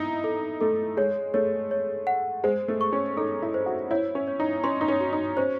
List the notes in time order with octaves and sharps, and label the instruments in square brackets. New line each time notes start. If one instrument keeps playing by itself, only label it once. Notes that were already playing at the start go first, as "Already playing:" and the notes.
Already playing: [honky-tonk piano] D#4 E4 [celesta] D#5
[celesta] A4
[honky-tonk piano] A3 [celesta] A4
[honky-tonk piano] G#3 [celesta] C#5
[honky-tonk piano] A3 [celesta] C#5
[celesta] C#5
F#5
[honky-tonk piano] G#3 [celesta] C5
[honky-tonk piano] A3
[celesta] C#6
[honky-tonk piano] C#4
[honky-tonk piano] D#4 [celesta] A4
[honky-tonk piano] E4
[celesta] C5
[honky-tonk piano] F#4
[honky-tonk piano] E4 [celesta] C#5
[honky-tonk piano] C#4
[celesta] C#5
[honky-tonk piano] D#4
[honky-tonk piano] C#4 [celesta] C6
[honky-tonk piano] D#4
C#4
[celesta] F#4
[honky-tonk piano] D#4
[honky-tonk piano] C#4 [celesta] C5